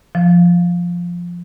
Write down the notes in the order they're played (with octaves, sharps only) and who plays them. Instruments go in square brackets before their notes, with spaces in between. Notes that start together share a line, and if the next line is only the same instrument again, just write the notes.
[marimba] F3